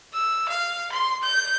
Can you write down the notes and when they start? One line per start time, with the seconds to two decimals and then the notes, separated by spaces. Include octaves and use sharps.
0.13 E6
0.49 F5
0.92 C6
1.23 G6